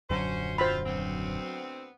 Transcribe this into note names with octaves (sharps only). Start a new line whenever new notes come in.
D#1 F#2 D3 F#3 C#4 C5
C4 F4 C5 B5
D2 B3 C4